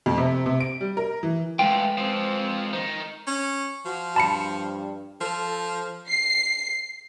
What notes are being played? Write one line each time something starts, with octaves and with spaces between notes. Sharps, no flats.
F2
C3
C3
D7
G3
A#4
E3
G#3 A3 F4 B4 G5
F3 C4
D#3 D#4
C#4
F3 F#4
G2 A5 B5 C#7
F3 A4
C7